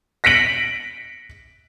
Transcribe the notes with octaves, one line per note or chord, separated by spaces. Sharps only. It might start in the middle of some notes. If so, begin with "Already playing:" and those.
A#6 B6 C#7 D7 F#7